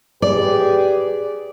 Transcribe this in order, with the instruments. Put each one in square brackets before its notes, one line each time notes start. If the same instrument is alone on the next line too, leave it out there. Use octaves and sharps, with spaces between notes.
[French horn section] G4 G#4 B4 [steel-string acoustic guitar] D5